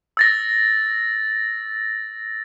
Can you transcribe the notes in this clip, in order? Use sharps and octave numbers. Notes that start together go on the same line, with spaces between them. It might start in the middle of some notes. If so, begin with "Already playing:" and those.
E6 A6 A#6